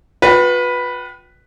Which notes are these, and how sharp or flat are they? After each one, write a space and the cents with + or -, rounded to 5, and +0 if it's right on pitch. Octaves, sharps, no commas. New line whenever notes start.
F4 +45 B4 +0 G5 -20